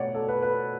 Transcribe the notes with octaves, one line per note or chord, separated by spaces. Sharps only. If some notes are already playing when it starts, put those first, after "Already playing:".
Already playing: B2 A3 C#5 D5 F#5
A4
B4
B4